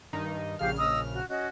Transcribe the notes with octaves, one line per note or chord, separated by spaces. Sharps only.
G2 D#3 D#4
A#1 C#3 G4 F5 F6
D#5 D#6 E6
F#4
C#4 F#4 D#5